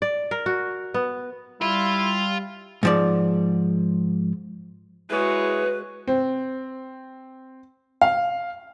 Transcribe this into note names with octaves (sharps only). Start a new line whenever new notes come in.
D5
A#4
F#4
B3
G3 E4 F4
G#2 F3 D5
G#3 E4 F#4 G#4 B4 C#5
C4
F5